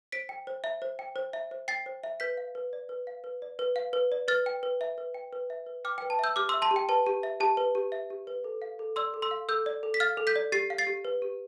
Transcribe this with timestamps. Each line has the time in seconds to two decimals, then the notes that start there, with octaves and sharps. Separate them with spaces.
0.12 C5 B6 D7
0.29 G5
0.47 C5
0.64 E5
0.82 C5
0.99 G5
1.16 C5
1.33 E5
1.51 C5
1.68 G5 A6 C7
1.86 C5
2.04 E5
2.20 B4 G6 B6
2.37 F5
2.55 B4
2.73 D5
2.89 B4
3.07 F5
3.24 B4
3.42 D5
3.59 B4
3.76 F5
3.93 B4
4.12 D5
4.28 B4 F6 A6
4.46 G5
4.63 B4
4.81 E5
4.98 B4
5.14 G5
5.33 B4
5.50 E5
5.66 B4
5.85 G5 D6 F6
5.98 B4 G5
6.10 A5
6.19 E5 E6 G6
6.36 G4 D6 F6
6.49 E5 C6 E6
6.62 A5 C6
6.71 G4
6.76 G5
6.89 B4 A5
7.06 G4
7.23 E5
7.40 G4 A5
7.57 B4
7.75 G4
7.92 E5
8.10 G4
8.27 B4
8.44 A4
8.62 F5
8.79 A4
8.96 D5 C6 E6
9.14 A4
9.22 C6 E6
9.31 F5
9.48 A4 E6 G6
9.66 D5
9.83 A4
9.94 B6
10.00 F5 F6 A6
10.17 A4
10.27 G6 B6
10.36 D5
10.52 G4 A6 C7
10.70 F5
10.78 A6 C7
10.87 G4
11.05 B4
11.22 G4